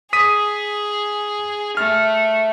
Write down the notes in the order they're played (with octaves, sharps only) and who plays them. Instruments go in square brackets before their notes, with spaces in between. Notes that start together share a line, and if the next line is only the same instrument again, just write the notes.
[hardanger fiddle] G#4 [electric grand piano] D#6 B6 D#7
[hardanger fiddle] A3 [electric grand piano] F6